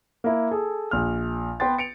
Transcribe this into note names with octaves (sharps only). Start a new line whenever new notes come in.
A#3 E4
G#4 A4
A#1 F6
B3 B4 G5 C6 A6
C#7 D7 F7